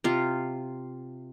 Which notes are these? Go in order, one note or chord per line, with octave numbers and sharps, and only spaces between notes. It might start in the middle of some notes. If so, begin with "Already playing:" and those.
C3 F4